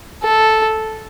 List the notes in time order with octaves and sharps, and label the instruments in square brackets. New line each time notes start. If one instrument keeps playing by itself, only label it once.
[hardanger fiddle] A4